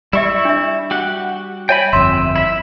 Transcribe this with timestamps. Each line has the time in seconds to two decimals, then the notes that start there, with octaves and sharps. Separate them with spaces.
0.13 G3 E4 D5 E5 C#6
0.45 D4 E5
0.91 F#4 G4 F#5
1.69 C#5 E5 G5 G#5 B5
1.93 G1 F2 E5 C6
2.36 E4 E5